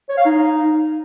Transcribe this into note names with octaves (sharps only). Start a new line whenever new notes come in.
C#5
F5
D#4